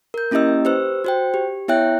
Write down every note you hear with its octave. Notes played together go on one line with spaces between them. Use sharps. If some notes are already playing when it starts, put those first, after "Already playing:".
A#4 G6
A#3 C#4 E4 G4 D#5 E6
G4 B4 C5 E6
F#4 C5 G5
G4
B3 E4 C#5 E5 G5 F#6